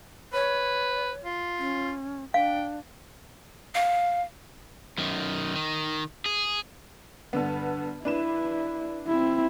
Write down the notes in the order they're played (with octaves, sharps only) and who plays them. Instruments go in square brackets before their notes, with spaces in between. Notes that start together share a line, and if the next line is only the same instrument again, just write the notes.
[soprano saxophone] B4 [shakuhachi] C#5
[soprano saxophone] F4
[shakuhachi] C#4
[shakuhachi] D4 [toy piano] F5 [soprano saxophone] G5
[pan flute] F5
[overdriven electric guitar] F#2 D#3
D#3
G#4
[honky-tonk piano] G2 D3 B3
[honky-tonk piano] D4 B4 E7 [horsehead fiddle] E4
[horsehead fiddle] C4 E4